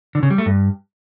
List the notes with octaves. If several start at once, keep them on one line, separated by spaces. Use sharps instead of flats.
D3
C#3
G3
A3
G2